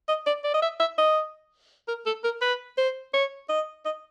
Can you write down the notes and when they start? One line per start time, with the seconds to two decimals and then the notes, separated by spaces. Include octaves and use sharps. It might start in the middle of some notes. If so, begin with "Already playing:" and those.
0.08 D#5
0.26 D5
0.44 D5
0.54 D#5
0.62 E5
0.80 E5
0.98 D#5
1.88 A#4
2.06 A4
2.24 A#4
2.42 B4
2.78 C5
3.13 C#5
3.49 D#5
3.85 D#5